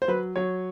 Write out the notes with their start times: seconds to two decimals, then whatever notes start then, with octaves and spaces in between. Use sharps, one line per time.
0.02 C5
0.08 F#3 B4
0.36 F#3 C#5